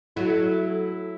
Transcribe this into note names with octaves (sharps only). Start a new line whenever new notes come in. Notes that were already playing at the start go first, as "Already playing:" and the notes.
F#3 A3 E4